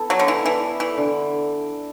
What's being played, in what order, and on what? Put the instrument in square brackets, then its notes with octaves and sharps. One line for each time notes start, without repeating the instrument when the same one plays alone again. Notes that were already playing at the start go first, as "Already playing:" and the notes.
Already playing: [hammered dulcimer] B3 E4 A4
[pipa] F#3 [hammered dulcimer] D5
[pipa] D3
[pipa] E3 [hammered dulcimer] B3
[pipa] E3 [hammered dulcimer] E4
[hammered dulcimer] A4
[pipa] E3 [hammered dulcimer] D5
[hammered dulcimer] D3